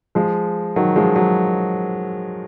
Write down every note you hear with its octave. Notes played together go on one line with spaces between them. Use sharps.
F3 G#3
D#3 F#3
F3 G#3
F#3